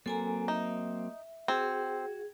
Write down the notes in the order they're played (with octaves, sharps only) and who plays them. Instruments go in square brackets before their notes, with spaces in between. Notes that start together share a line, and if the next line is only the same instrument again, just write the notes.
[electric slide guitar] F#3 A#3 C4 [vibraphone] A4 G#5 A#5
[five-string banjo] D#4 [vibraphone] E5
[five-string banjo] C4 [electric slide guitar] F#4 [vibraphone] G#4